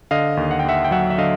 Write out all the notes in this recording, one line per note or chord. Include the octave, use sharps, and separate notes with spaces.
D3 D#5 F5
D#2
F#5
G5
D#2 E5 F#5
G5
F#3 E5 F#5
E5
D3 D#5 F5